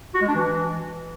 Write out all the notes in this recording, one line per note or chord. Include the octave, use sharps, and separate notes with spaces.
F#4
G#3
D4
E3